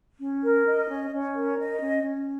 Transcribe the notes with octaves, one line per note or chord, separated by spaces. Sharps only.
C#4
A#4
D#5
C#4
C#4
A#4
D#5
C#4
C#4